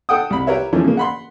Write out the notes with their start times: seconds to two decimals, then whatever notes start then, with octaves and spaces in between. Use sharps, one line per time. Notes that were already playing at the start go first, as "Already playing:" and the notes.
0.09 A4 F#5 G5 D#6
0.30 C2 B5
0.47 G4 A#4 B4 C#5 E5
0.73 E3 F3 A3 C#4 D4
0.84 C#3 A#3
0.97 F#5 B5 C6